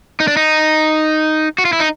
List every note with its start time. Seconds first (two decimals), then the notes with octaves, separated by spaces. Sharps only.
0.20 D#4
0.28 D4
0.37 D#4
1.58 F#4
1.65 F4
1.73 E4
1.80 D#4